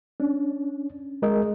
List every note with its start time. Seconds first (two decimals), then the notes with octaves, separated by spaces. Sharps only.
0.20 C#4 D4
1.22 G#3 G#4 A#4 D#5